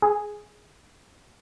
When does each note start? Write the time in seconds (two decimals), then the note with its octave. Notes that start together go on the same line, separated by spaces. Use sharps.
0.02 G#4